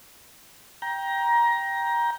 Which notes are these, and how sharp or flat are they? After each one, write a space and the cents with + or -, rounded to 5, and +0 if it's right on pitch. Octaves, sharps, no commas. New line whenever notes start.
G5 +0 A#5 +20